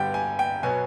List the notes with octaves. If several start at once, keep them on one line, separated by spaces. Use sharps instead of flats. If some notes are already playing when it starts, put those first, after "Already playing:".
Already playing: G2 D3 G3 B3 G5
G#5
G5
B2 F#3 B3 G#5